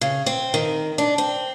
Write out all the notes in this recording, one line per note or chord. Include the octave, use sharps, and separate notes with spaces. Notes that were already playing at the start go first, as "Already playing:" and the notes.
C#3
C4
D#3
D4
C4